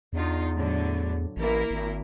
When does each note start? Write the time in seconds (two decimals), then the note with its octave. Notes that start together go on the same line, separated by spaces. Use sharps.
0.13 E2 D4 D#4 F4
0.56 A2 D3 F#3
1.37 A1 A#3 E4 A#4
1.71 G#1